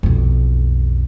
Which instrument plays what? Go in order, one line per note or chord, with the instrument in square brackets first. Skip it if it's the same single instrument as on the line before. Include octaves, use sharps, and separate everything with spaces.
[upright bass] B1 F2